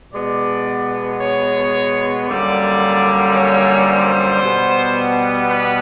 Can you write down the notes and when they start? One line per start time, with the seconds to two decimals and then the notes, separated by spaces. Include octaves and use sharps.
0.14 B2 G#3 B3 D5
1.21 C#5
2.28 F#2 D3 G3 A#3 D5
3.35 C#5
3.89 C5
4.42 B2 G3 B3
5.49 B4